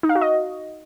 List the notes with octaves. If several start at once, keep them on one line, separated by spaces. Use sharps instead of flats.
D#4
F5
F#4
D#5